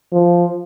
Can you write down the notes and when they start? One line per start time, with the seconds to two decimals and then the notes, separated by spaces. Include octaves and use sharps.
0.12 F3